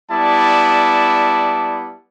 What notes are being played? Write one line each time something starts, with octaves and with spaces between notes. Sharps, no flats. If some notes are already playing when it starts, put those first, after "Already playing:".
G3 B3 E4 D5 A5